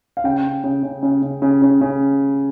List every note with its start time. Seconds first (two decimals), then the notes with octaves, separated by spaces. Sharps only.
0.17 F5
0.24 C#3 G5
0.44 C#3
0.64 C#3
0.83 C#3
1.03 C#3
1.22 C#3
1.42 C#3
1.62 C#3
1.81 C#3